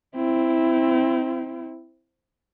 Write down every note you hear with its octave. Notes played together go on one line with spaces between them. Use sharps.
C4 E4